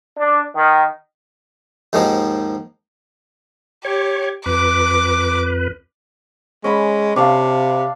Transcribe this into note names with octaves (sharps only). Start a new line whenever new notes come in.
D4
D#3
D#2 G#2 D#3 F3
G4 C#5
F2 B4 D6
G#3 C#4 B5
C3 D4 F5